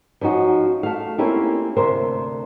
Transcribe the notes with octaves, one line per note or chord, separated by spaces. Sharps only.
F3 C#4 D#4 F#4
A3 F5
A#3 C4 C#4 E4 F4 G4
D2 C3 A#4 C5 E5